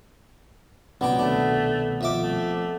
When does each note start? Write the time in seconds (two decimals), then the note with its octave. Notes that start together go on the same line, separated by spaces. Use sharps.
1.01 C2 A#2 F#3 B3 C4 D4 G5
1.19 C2 B2 D#3 A3 D4
2.01 F2 E5 D6
2.21 A3